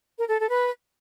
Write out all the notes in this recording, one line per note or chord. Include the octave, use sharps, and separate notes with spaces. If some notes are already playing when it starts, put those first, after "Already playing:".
A#4
A4
A4
B4